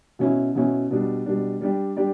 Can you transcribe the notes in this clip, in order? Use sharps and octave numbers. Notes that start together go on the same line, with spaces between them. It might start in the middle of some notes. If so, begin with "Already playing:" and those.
B2 F#3 C#4 E4
B2 F#3 C#4 E4
B2 G3 D4
B2 G3 D4
G3 D4 G4 D5
G3 D4 G4 D5